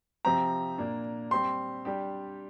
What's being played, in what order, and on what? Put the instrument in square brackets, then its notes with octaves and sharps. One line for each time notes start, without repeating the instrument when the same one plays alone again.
[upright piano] C3 F3 C4 G4 [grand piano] A#5
[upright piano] A#2 A#3 D4
[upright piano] G3 C4 G4 [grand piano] C6
[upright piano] G3 D4 G4